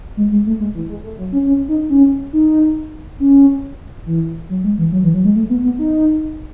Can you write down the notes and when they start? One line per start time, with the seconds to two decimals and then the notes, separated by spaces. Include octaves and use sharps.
0.17 G#3
0.32 G#3
0.47 A3
0.60 G#3
0.75 E3
0.90 G#3
1.04 A3
1.18 F#3
1.33 C#4
1.46 C#4
1.68 D#4
1.90 C#4
2.33 D#4
3.20 C#4
4.06 E3
4.50 F#3
4.64 G#3
4.78 E3
4.92 F#3
5.04 E3
5.14 F#3
5.25 G#3
5.36 A3
5.50 B3
5.64 B3
5.79 D#4